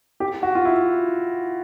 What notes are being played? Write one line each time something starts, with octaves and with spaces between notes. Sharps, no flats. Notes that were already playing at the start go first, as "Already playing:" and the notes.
G4
F#4
F4
E4